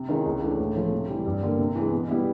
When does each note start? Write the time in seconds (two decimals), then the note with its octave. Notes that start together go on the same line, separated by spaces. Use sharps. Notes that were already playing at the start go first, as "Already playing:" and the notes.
Already playing: C3
0.09 D#3 G#3 C#4 E4
0.26 C#2
0.42 C#3 E3 A3 D4
0.58 A2
0.76 F3 A3
0.92 C3
1.08 E3 G3
1.26 G2
1.43 D3 G3 A#3
1.59 C3
1.76 E3 G#3
1.92 B2
2.08 G3 B3 E4